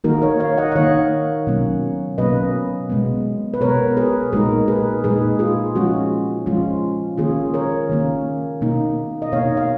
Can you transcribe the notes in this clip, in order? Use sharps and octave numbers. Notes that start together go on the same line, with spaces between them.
D#3 A#3 D#4 F#4 A#4
A#4 C#5
C#5 F5
D#5 F#5
F#5
D#3 A#3 D#4 C#5 F5
B2 F#3 A#3 C#4
B2 F#3 A#3 C#4 B4 D#5
B2 G#3 B3
B4
B2 G#3 B3 A#4 C#5
G#4 B4
A#2 G#3 D#4 F#4 A#4
G#4 B4
A#2 G#3 D#4 G#4 B4
F4 G#4
F3 G#3 C#4 F4 F#4
F3 G#3 C#4 F4
D#3 A#3 C#4 F4 G#4
A#4 C#5
D#3 A#3 C#4
B2 A#3 D#4
D#5
B2 A#3 D#4 C#5 F5
F5